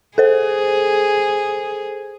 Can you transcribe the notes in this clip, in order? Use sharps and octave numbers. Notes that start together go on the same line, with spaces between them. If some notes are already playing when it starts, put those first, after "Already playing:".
G#4 A4 C5